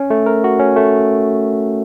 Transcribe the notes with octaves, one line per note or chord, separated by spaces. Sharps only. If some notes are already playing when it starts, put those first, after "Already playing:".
Already playing: C#4
A3
A#4
F#4
C#4
A3